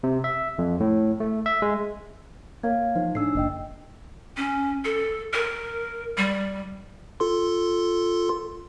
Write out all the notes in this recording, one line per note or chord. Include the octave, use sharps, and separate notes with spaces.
C3
E5
F2
A2
A3
E5
G#3
A#3 C#5 F5 G#6
F3 D#4
A2 D4 E6 C7
F#1 A#3 D#5 G5
C#4
A4
A#4
G3
F4 A4 C6